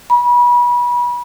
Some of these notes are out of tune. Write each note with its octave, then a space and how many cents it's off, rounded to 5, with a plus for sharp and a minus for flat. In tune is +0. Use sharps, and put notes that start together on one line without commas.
B5 -30